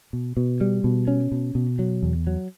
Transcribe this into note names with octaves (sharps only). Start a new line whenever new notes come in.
B2
B2
G3
B2
C#4
B2
B2
F#3
E2
F#3